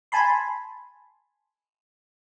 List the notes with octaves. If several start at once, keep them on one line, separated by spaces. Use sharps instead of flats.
G#5 A5 B5 C6